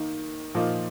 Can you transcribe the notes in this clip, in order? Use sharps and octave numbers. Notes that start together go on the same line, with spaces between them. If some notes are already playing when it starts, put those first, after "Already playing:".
Already playing: D#3 A#3 D#4
A#2 F3 A#3 D#4